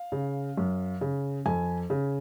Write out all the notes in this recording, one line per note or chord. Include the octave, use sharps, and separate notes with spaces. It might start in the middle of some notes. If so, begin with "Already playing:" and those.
Already playing: F5
C#3
F#2
C#3
F2 G#5
C#3